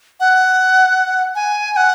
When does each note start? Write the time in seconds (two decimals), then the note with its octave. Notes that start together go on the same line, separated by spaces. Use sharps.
0.20 F#5
1.35 G#5
1.72 G#5
1.76 F#5